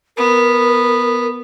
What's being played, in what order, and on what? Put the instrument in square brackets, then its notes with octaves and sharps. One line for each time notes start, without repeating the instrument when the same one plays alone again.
[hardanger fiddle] B3 [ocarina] A#4